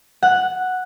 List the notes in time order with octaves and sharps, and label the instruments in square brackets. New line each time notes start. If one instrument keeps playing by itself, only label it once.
[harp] F#5